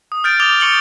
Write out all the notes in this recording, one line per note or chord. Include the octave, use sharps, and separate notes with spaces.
D#6
F6 G6 A6 D7
D6 D#6 G6 A6 F7 G7
C#6 C#7 F#7 G7